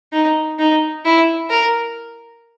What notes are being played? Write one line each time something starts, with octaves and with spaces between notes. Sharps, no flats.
D#4
D#4
E4
A#4